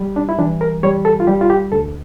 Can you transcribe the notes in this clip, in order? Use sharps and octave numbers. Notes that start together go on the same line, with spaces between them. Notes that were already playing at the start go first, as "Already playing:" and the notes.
Already playing: G3
D4
E4
E3 D4
A#4
G3 C#5
A4
F4
G3 G4
F4
G4
D2 A4